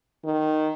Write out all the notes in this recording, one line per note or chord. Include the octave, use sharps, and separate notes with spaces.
D#3